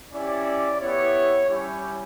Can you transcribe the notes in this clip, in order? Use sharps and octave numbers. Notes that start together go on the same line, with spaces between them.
C#4 E4 G4 D5
B3 E4 G4 C#5
G3 C#4 E4 G4 C#5